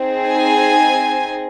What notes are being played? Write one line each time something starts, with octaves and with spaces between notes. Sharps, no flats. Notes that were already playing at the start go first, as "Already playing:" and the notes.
Already playing: C4 D#4 G#4
G#5